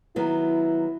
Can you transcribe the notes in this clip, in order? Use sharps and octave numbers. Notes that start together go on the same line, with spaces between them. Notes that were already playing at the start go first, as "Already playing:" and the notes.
D#3 F#3 B3 E4